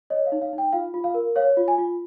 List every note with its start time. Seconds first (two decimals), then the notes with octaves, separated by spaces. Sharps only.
0.10 C#5 D#5
0.26 F5
0.32 D#4
0.42 F5
0.53 D#4
0.58 G5
0.73 F4 F5
0.94 F4
1.04 F5
1.14 A#4
1.36 C#5 F5
1.57 F4
1.68 G#5
1.78 F4